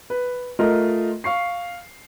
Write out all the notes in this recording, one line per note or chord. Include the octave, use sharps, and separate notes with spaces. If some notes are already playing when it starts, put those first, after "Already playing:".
B4
A3 F4 A#4 D#5
F5 C#6 C7